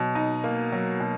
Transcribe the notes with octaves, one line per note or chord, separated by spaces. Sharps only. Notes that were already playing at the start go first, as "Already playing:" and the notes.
Already playing: B2 F#3
D#4
A#3
F#3
B2